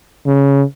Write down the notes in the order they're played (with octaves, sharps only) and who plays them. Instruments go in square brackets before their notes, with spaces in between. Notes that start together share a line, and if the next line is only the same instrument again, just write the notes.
[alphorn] C#3